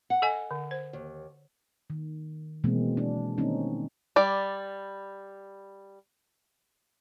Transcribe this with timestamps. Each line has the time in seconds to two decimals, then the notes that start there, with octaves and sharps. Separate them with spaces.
0.10 F#5
0.22 A4 D#5 G#5
0.51 D3
0.71 C5
0.93 D#2
1.90 D#3
2.64 B2 E3 G#3 A#3 C4
2.97 D4
3.38 D#3 G3 A#3 C4 C#4 D#4
4.16 G3 D5